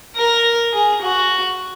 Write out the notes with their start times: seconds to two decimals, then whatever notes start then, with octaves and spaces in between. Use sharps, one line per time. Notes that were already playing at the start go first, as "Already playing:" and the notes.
0.17 A#4
0.73 G#4
1.02 F#4